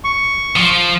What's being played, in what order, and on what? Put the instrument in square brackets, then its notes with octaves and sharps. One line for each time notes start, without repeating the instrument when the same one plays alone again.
[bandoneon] C#6
[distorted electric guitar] F3